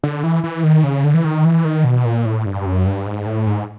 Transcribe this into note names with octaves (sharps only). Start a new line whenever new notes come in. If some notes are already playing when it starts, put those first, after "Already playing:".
D3
E3
E3
D#3
C#3
D3
E3
D#3
E3
D#3
B2
A#2
A2
G2
F#2
G2
G#2
A2
G#2